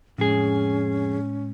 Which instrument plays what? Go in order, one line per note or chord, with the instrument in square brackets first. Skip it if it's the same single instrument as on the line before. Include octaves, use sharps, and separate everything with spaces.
[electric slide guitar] F2 G#4 [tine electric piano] A2 G#3 [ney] C#4